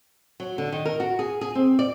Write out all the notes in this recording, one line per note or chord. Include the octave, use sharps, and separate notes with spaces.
F#3
D3
D#3
A#4
F#4
G#4
G#4
C4
D5